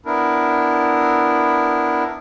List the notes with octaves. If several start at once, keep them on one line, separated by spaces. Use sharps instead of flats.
B3 D4 E4 A#4